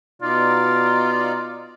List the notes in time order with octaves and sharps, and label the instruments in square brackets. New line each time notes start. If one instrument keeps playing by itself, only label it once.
[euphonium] B2 [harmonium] D#4 D5 [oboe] F4